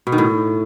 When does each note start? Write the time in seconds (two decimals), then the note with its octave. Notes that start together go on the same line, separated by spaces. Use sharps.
0.07 B2
0.12 D#3
0.18 A2